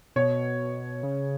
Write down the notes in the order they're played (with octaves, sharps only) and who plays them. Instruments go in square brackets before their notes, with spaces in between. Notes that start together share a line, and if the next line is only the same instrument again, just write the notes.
[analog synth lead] B2 [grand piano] C#5
[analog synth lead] C#3